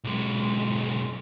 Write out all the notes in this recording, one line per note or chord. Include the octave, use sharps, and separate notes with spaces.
B1 G#3